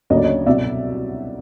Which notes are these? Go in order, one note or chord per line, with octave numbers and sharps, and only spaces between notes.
D2 C#3 F#3 A#3 D#5
D5
C#5 D#5
C2 B2 F#3 D5 E5